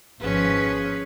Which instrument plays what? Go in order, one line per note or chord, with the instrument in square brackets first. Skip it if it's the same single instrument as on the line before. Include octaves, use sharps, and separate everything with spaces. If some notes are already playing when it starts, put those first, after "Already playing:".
[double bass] G#1 F3 [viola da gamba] C#4 G#4 B4